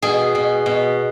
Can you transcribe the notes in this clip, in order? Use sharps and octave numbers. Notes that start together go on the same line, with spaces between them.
B2 G#4
B2
B2